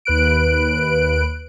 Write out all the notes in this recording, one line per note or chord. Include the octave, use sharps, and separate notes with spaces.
D#2 B4 F#6 D7